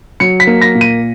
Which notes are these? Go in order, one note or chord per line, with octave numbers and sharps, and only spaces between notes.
F#3 C#7
B6
A#3
A#6
A#2
D#7